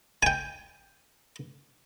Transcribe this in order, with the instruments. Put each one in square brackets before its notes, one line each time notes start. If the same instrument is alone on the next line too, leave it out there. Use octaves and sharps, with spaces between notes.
[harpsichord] G5 G#5